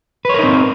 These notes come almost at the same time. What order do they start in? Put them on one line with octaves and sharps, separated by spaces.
B4 C#5 A#4 D#4 C4